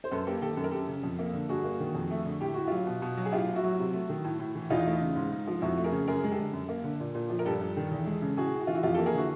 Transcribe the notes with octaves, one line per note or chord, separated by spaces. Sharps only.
C5
F#2 A4 B4
A#3 G4 A4
D#3 G4 A4
F#2 A4
A#4
F#2 G4 A4
C#3
F2
A#3
D3
G2 F#4 G#4
A#3
D#3
F2
A3
D3
A2 G4
A2 F#4
F#3 F4 G4
B2
B2
F#3
G#4
A2 F4 G4
A2
E4 F#4
F#3
C3
A3
D#3
A2
A2
E3
E2 D#4 F4
A3
C#3
G#2
G#2
F3
F2 E4 F#4
A3
G#4 A#4
C#3
F#2 G#4 A#4
G#3
G4 A4
D3
F#2
A#3
D3
A#2
A#2
F3
A#4
G2 G4 A4
G2
D#3
E2
G#3
C#3
A2 F#4 G#4
A2
F#4
E3 F4
E4 F#4
F2 F4 G4
A#3 G4 A4
G#4 A#4
D3 E4 F#4